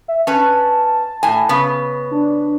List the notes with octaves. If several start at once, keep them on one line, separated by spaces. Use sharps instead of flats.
E5
C#4 B4 A5
A2 G#5
C#3 B3
D4